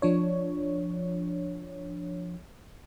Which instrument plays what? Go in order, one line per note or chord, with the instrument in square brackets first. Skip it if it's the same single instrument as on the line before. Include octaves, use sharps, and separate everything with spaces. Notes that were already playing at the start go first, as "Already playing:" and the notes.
[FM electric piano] F3 D4 C#5